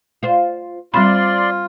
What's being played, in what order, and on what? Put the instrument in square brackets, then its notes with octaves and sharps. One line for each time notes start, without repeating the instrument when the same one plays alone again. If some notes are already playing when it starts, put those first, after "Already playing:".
[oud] F4 C5
[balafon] G3 C4 B5 [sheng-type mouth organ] F4 [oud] C5 [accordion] D5 C6